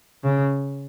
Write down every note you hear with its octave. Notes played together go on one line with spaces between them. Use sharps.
C#3